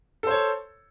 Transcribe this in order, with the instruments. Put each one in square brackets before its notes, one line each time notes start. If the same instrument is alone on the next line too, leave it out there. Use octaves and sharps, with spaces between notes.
[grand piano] A4
C5
C#5